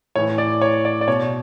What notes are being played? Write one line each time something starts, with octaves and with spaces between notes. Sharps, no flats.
A2 E3 C#5
D5
C#5
D5
D5
B2 C#5